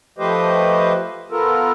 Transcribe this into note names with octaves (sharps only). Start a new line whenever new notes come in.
F3 A3 G4 B4 C5 D#5
B3 F4 A4 A#4